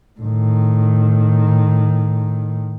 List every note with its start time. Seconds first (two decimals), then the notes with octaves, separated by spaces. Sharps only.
0.21 A2 D#3